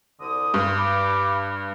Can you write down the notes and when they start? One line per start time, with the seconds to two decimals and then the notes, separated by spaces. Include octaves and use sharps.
0.21 C2 D3 D#6
0.54 G2
0.78 B5 D6